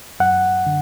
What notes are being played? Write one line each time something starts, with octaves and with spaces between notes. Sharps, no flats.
F#2 F#5
D3